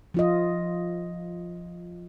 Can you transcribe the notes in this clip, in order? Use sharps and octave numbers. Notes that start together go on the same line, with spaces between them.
F3 F4 D#5